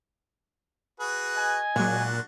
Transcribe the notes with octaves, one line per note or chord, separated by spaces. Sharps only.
F#4 G#4 B4
D#5 G#5
A#2 F#3 G#3 D4 F#4